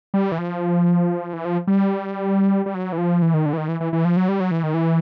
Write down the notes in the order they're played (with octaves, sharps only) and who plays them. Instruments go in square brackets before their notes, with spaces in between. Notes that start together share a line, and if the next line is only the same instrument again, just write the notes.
[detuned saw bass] G3
E3
F3
E3
F3
G3
G3
F#3
E3
F3
E3
D#3
D3
E3
D#3
E3
E3
E3
F3
F#3
G3
F#3
E3
D#3
E3